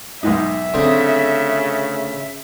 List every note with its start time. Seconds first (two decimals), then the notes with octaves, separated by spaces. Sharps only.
0.23 B1 G#2 D#4 E5
0.74 D2 C#3 C4 D#6